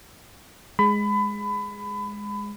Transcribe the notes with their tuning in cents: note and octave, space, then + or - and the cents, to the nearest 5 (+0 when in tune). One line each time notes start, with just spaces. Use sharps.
G#3 -5 B5 +25